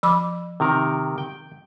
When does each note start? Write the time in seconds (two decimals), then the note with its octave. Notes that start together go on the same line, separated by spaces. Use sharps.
0.03 F3 B5 D6
0.60 C3 D#3 A#4
1.18 G5